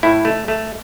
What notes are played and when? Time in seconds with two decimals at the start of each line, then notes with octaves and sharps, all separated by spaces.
0.03 A2 E4
0.25 A3
0.48 A3